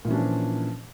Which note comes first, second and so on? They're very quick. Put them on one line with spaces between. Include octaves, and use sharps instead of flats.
A#2 E3 C#4 D4 F3